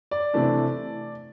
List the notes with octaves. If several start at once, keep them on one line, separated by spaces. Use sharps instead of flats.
D5
C3 E3 A3 D4